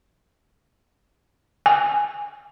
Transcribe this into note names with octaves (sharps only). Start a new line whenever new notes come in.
G#5